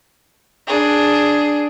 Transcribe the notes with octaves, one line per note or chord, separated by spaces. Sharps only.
D4 G#4